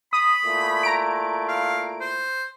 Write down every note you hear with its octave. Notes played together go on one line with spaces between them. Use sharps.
B5 D#6
A#2 A3 E4
A#5 D7
F5
C5